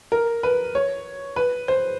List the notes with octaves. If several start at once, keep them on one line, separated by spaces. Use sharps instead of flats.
A#4
B4
C#5
B4
C5